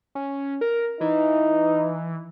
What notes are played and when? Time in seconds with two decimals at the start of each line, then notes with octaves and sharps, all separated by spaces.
0.15 C#4
0.61 A#4
1.01 E3 D#4